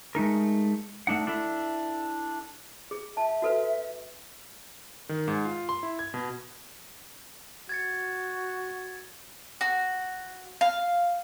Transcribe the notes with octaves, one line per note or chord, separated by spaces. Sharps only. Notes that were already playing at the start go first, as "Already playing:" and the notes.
G#3 A3 D#4 A#4
A3 D4 D#4 F#5
D4 E4 A4 E5
G#4
E5 A5
F#4 A4 B4
D#3
G#2
F4
C6
E4
G#6
B2
F#4 G#6 A6 C#7
F#4
F5